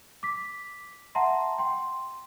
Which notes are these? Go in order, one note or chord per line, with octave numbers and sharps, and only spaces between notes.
D6 B6
E5 F#5 A5 A#5 C6
G5 C6